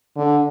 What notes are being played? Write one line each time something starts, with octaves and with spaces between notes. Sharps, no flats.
D3